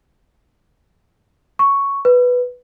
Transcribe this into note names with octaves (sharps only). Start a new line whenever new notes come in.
C#6
B4